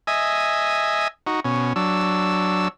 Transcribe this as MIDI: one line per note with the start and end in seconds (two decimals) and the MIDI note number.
0.07 1.08 75
0.07 1.08 76
0.07 1.08 80
1.27 1.40 63
1.27 1.40 66
1.45 1.73 47
1.45 1.73 61
1.76 2.68 54
1.76 2.68 62
1.76 2.68 88